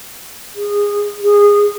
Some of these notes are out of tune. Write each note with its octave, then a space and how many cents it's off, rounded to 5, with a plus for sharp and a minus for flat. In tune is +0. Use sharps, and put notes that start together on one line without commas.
G#4 -20
G#4 -20